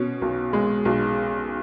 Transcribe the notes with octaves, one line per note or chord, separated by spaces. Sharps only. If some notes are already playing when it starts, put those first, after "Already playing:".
Already playing: B2 C#4
B1
G#3
B1